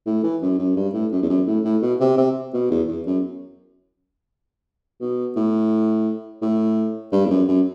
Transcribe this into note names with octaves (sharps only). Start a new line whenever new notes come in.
A2
E3
F#2
F#2
G2
A2
F#2
E2
F#2
A2
A2
B2
C3
C3
B2
E2
E2
F#2
B2
A2
A2
G2
E2
F#2
F#2